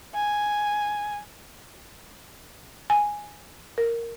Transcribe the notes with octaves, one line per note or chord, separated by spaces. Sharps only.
G#5
G#5
A#4